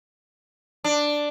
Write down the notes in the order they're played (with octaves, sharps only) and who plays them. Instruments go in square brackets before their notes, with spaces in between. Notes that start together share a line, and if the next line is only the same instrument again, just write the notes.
[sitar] D4